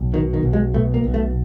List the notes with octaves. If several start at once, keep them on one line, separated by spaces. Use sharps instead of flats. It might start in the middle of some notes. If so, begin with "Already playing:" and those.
Already playing: B1
B2 D#3
D#3
B1
G#3
B2 A3
A#3
B1
A3